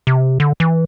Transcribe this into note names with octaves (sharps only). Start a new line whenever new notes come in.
C3
D3
E3